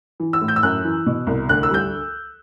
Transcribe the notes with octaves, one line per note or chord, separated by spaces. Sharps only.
E3
E6
A2
G6
E6
F#2 F#6
E3
B2
C2
D2 F#6
E6
G3 G6